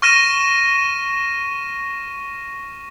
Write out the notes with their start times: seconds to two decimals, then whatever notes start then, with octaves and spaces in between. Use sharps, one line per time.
0.02 C#6 F6 A#6 D#7 E7